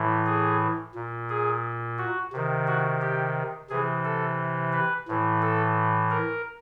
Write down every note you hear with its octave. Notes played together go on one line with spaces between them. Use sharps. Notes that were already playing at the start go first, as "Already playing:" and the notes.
Already playing: A2 E3
G#4
A#2
G#4
F#4
C3 D#3
F#4
G4
C3 E3 G#4
A4
B4
A2 E3
A4
A#4